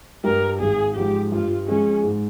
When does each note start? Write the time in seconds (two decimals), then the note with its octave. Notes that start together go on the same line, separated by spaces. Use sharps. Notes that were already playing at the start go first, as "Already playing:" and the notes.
0.24 G2 G3 A#4
0.60 G#1 G#4
0.96 G#2 F3 G4
1.32 G2 F4
1.68 F3 G#3 C#4
2.04 G#2